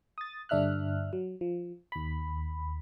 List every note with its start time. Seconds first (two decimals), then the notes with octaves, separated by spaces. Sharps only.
0.18 D#6 A6
0.49 G2 D3 D4 E5 F6 F#6
1.13 F#3
1.41 F3
1.92 D#2 B5